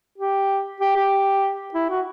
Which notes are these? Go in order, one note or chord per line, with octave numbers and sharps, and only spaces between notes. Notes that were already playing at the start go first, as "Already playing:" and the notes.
G4
G4
G4
E4
F#4